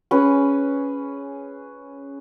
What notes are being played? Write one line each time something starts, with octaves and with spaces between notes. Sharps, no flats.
C#4 G#4 B4